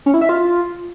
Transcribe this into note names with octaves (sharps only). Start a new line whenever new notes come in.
C#4
E4
E5
F4